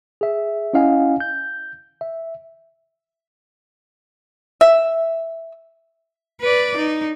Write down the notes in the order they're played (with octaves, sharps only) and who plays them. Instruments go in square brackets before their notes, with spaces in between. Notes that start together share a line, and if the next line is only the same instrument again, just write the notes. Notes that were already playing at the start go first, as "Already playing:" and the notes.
[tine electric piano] G#4 E5
C#4 E4 D#5 F5 F#5 G#5
G6
E5
[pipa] E5
[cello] B4 D5
D#4